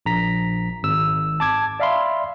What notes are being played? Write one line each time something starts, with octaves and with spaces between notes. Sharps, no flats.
A#1 A#5 B6
G#1 E6
A5 D6 G#6
D5 E5 F5 B5 C6